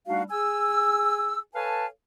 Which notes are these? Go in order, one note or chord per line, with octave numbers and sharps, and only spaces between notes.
G3 A3 D4 D#4 F#4 F5
G#4 G#5 E6
A4 B4 C#5 F5 G#5 A5